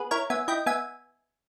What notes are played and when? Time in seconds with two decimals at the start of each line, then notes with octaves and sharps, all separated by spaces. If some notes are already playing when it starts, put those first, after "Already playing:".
Already playing: B3 G#4 B4
0.11 E4 A#4 C#5
0.30 B3 E5 G#5
0.48 E4 D#5 G5
0.66 B3 E5 G#5